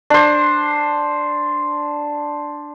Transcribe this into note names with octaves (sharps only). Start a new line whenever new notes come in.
D4 C5